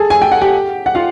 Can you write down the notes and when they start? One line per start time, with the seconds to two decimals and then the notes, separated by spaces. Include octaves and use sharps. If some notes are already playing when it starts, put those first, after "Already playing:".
Already playing: G#4 A4 G#5 A5
0.10 G#5
0.22 G5
0.32 F#5
0.41 G4 G5
0.86 F#5
0.95 F4 F5